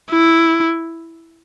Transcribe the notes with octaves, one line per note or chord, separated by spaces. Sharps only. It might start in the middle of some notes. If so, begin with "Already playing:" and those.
E4